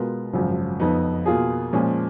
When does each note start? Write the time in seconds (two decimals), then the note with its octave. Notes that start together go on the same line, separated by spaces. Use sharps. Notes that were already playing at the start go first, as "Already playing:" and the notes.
Already playing: B2 G#3 B3 F4 A#4
0.33 G#1 F#2 C#3 F3
0.80 F2 F3 B3 D#4
1.26 B2 A#3 F4 G#4
1.73 A#2 F3 G#3 C#4